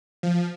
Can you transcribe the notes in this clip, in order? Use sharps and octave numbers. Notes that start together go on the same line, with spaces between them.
F3